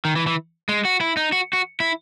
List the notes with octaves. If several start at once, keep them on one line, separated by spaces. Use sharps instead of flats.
D#3
E3
E3
G#3
F#4
E4
D#4
F#4
F#4
E4